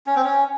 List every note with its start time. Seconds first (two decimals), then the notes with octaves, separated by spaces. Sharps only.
0.07 C#4
0.16 C4
0.24 C#4